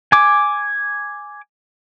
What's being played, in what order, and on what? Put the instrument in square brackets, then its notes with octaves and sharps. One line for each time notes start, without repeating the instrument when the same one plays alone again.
[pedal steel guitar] G#5 D6